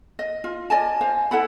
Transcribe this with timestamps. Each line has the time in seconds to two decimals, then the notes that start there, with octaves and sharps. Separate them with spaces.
0.19 D#5
0.44 F4
0.70 D5 D#5 G#5 A5
1.01 C5 F5
1.31 E4 A4 F#5 B5